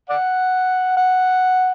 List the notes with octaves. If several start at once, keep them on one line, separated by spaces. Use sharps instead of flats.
D5 F#5
F#5